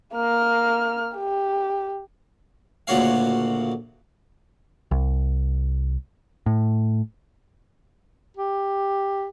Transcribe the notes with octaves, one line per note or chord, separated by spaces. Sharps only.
A#3 F6
G4
D2 A#2 C#3 F#4 C#5 F5
C2
A2
G4